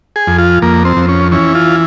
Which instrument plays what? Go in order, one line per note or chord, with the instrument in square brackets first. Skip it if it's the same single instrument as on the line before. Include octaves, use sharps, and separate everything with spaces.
[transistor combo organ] G#4
F2
F4
F2 A#3
C4
F2
C#4
E3 C#4
F4